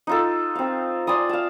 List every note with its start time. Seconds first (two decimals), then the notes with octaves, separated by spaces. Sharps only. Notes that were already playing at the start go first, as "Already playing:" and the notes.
0.07 D#4 F4 A4
0.55 C4 F5
1.07 D5 G#5 C6 D#6
1.29 F5 A5